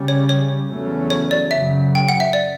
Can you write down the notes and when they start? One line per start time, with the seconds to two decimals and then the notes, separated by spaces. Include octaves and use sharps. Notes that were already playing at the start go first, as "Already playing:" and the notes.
Already playing: C#3 G3 C#4
0.08 C#5
0.29 C#5
0.69 E2 C#3 F#3 A3 C#4
1.10 C#5
1.31 D5
1.51 F#2 C#3 F#3 E5
1.95 G5
2.09 F#5
2.20 E5
2.33 D5